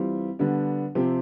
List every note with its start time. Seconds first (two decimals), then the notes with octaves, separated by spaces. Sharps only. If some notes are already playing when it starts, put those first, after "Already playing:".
Already playing: E3 G3 C4 F4
0.39 D3 G3 B3 D4
0.95 C3 F3 C4 G4